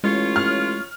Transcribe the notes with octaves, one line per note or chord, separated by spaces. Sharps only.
A1 G#3 F4 C#5
F6